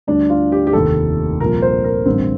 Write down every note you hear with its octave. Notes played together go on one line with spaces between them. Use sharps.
D2 D3 G3 D4
F4
G4
G4
F1 D#2 D#3 A4
C2 A#2 F3 A#4
C5
A#4
A1 G2 D3 C4